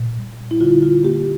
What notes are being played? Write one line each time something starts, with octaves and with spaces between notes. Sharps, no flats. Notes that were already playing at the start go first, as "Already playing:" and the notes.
Already playing: A#2
G3
E4
D3 F4
F4
A#3 G4